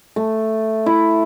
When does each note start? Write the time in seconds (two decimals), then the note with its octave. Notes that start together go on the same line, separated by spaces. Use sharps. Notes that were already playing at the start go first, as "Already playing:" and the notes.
0.16 A3
0.86 E4